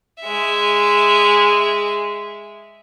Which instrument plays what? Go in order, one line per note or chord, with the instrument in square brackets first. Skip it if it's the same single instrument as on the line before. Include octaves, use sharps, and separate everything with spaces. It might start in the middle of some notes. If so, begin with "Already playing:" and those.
[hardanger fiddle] G#3 E5